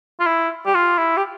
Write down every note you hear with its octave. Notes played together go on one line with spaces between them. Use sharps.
F4
E4
G4
F4
E4
G4